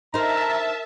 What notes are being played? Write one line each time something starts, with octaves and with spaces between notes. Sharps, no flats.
D#4 A#4 C5 E5 A5 A#5